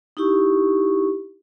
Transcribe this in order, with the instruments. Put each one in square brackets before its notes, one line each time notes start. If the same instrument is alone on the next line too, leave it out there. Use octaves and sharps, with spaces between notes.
[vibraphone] D#4 E4 G4 C#6